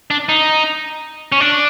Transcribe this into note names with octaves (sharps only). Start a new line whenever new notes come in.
D4
D#4
C#4
D4